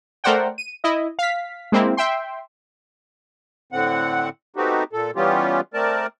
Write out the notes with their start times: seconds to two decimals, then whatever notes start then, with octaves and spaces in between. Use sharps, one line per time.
0.24 A3 A#4 C5 D5 F#5 G5
0.58 D#7
0.84 E4 D#5
1.19 F5 B6
1.72 G#3 A#3 C4 E4
1.97 E5 G5 C6
3.72 A2 D3 C4 F#5
4.56 A3 B3 C4 D#4 F#4 G4
4.93 A#2 A4
5.16 E3 G3 B3 C#4 F4 G4
5.74 A3 C4 A#4 D5 A5